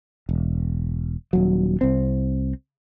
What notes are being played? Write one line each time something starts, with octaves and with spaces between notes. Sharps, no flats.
E1
D#1 F#3
C2 C4